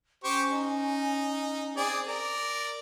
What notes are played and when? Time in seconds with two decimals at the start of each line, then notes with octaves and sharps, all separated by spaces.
0.24 C#4 G4 C5 C#6
0.50 D#4
1.77 C4 G#4 D5
2.07 A#4 D5